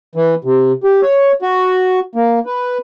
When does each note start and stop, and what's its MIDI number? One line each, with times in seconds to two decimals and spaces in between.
0.15 0.35 52
0.44 0.72 48
0.84 1.01 67
1.02 1.32 73
1.42 2.00 66
2.15 2.39 58
2.46 2.78 71